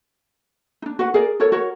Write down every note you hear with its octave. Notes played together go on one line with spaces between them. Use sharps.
D4 D#4
F#4 B4 F#5
G#4 A#4 D5
F#4 A4 A#4 C#5
F#4 A#4 C#5